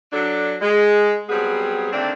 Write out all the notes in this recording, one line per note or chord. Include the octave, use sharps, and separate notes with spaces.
F#3 D4 A4
G#3
F#3 G3 B3 C4 G#4
D3 D#3 A3 A#3 C4 D4